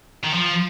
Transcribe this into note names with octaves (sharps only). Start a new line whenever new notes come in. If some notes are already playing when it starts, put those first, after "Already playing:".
D#3
F3